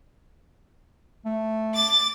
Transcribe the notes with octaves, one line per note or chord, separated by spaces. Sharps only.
A3
D6 A6